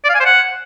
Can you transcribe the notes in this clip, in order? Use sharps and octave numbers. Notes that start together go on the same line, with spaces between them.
D5
F5
G#5
C5
F#5